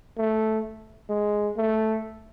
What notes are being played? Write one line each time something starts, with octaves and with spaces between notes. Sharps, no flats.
A3
G#3
A3